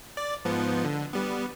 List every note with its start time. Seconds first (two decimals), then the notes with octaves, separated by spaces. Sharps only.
0.17 D5
0.45 G#2 F3 B3
0.85 D3
1.13 G3 B3